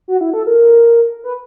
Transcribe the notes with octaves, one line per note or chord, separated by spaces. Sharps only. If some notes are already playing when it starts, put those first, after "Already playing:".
F#4
E4
A4
A#4
B4